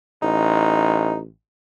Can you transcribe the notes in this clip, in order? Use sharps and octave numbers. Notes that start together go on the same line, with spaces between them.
A1 D#4